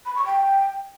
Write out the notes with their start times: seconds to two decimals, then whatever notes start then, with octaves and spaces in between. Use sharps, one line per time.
0.05 B5
0.16 C#6
0.26 G5